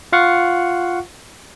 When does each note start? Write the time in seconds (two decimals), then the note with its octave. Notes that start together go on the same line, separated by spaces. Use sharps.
0.13 F4 F5 F#5 C#6